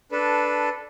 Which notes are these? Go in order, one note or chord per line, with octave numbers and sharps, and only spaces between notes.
D4 A4 B4